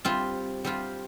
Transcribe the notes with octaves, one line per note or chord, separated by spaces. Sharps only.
G3 C4 F4
G3 C4 F4